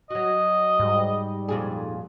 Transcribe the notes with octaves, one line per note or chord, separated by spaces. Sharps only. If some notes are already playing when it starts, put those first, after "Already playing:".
F#3 F#4 D#5
G#2 G3
F2 A#2 G#4